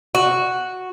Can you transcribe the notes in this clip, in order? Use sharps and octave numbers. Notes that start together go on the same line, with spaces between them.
F#4